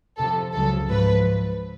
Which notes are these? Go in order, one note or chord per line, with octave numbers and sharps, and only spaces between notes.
F2 C3 F3 A4
C#2 C#3 F#3 A4
G#2 F3 B4